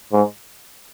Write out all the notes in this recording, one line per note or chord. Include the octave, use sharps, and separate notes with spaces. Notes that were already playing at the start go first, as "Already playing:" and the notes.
G#2